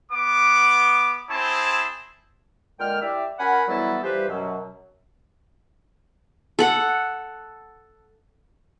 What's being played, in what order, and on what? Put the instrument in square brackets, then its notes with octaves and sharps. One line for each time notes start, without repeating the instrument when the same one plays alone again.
[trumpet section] B3 D6
C4 E4 G#4 C5 A5
[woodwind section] A#2 D3 G#3 G5 F6
E4 G4 D5 E5
C#4 F#4 A#4 F#5 G#5 B5
E3 F#3 G3 B3 E4 A4
E3 F3 G3 G4 B4 C5
F#2 B2 F#3
[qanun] A4 F#5